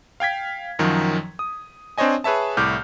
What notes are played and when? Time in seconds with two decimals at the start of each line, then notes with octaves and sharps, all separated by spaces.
0.20 F5 G5 G#6 B6
0.79 F#2 D#3 F3 F#3
1.39 D#6
1.98 C4 D4 C5 C#5 D#5 G#5
2.24 G#4 B4 C#5 E5 A5
2.57 C2 A2 D6 F6 G6